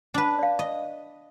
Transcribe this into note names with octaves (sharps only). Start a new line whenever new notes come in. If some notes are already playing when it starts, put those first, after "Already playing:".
D4 B4
D5 F5
D#5